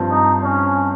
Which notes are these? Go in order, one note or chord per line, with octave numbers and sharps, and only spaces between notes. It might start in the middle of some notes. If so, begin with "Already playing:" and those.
Already playing: G2 F3 C4
D#4
C#4